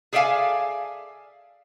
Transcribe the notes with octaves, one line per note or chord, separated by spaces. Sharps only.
G#4 A4 D5 E5 F5 G#5